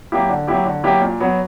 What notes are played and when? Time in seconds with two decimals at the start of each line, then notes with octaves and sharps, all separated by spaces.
0.12 F#3 A#3 E4 G4
0.29 D3
0.47 F#3 A#3 E4 G4
0.66 D3
0.84 F#3 A#3 E4 G4
1.01 A#2
1.20 F#3 B3